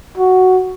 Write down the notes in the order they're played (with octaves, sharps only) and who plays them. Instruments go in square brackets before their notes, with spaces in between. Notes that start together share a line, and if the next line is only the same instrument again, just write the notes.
[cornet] F#4